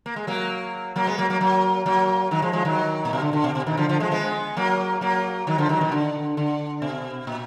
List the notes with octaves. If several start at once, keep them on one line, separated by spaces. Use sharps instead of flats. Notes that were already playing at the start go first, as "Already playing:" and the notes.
A#3
G#3
F#3 A#3
F#3 A#3
G#3 B3
F#3 A#3
F#3 A#3
F#3 A#3
F#3 A#3
D#3 F#3
F3 G#3
F3 G#3
D#3 F#3
A#2
B2
D3
D3
B2
B2
B2 D#3
D3 F3
D3 F3
F3 G#3
G#3 B3
F#3 A#3
F#3 A#3
D#3 F#3
D3 F3
D#3 F#3
B2 D#3
D3
D3
B2
A#2